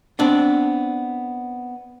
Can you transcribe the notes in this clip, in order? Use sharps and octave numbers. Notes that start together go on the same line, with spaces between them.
B3 C4 D4